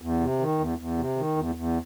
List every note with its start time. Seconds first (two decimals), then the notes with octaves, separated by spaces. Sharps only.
0.02 E2
0.21 C3
0.39 D#3
0.59 E2
0.78 E2
0.98 C3
1.17 D#3
1.36 E2
1.55 E2